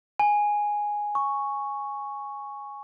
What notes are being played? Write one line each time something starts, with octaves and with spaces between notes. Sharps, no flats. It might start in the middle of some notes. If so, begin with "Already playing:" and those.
G#5
C#6